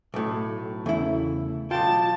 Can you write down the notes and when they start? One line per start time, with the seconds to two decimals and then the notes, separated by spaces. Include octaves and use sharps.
0.14 B1 A2
0.86 E2 C#3 A3 E4
1.71 B1 F4 G5 A5